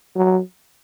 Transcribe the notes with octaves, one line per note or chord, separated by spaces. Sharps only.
F#3